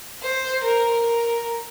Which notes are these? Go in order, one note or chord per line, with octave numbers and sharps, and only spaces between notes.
C5
A#4
A#4